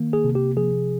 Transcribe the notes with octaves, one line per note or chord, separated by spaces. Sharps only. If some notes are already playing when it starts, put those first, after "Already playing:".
Already playing: D#3 A#3
G#4
C3
G4
F3 G#4